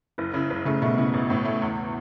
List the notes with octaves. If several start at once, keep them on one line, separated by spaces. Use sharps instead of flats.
F#1 E4
C#3 E4
F#1 E4
C#3 A3
B2 A3
C#3 E4
A1
A2
A3
E2